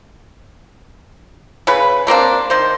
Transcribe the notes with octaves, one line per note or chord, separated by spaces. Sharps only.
C#3 B4
A3 A#3 C4 D4
D#3 C5